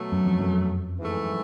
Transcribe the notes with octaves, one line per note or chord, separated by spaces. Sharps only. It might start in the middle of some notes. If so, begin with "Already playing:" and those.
Already playing: B2 F#3 A3
F#2
F2
F#2
G#2 E3 A3